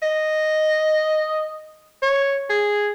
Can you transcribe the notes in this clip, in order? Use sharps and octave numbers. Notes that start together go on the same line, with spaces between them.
D#5
C#5
G#4